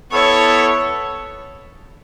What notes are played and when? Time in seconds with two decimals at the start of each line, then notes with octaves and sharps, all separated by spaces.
0.11 B3 E4 A4 C#5